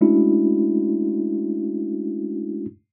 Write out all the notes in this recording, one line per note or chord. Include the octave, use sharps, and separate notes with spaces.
G#3 A3 C#4 D4 E4 F#4